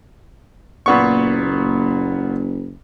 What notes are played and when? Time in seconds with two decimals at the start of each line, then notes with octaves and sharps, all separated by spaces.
0.86 F#1 A#2 B3 C#6